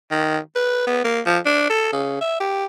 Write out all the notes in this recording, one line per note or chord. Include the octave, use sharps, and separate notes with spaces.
D#3
B4
B3
A#3
F3
D4
A4
C#3
E5
G4